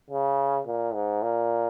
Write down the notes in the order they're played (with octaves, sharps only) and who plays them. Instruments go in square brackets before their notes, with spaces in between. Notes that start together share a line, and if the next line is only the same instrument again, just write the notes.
[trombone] C#3
A#2
G#2
A#2